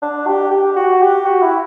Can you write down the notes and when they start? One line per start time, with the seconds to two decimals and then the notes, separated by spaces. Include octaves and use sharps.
0.02 D4
0.27 G4
0.51 G4
0.76 F#4
1.01 G4
1.26 F#4
1.42 E4